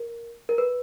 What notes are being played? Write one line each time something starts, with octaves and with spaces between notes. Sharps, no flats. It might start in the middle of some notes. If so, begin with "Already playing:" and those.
Already playing: A#4
A#4
B4